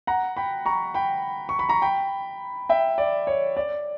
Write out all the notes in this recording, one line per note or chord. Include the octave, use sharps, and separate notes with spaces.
F#5 A#5
G5 B5
A#5 C#6
G5 B5
C#6
B5
A#5 C#6
G5 B5
E5 G5
D5
C#5
D5